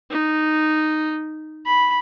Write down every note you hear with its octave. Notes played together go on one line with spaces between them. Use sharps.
D#4
B5